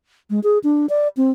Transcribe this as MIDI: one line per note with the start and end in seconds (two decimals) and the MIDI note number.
0.30 0.40 56
0.44 0.58 68
0.64 0.86 62
0.89 1.08 74
1.17 1.31 60